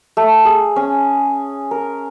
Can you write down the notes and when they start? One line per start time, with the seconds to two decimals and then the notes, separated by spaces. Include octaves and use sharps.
0.17 A3
0.45 G#4
0.76 C#4
1.71 A#4